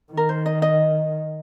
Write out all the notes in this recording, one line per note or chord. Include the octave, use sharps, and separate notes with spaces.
D#3
A#4
C5
D#5
D#5